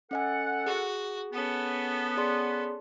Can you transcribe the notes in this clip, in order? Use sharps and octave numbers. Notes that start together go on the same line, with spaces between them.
C#4 A4 D#5 F#5 G#5
F#4 G#4
B3 C#4 A4
G#4 D5 C6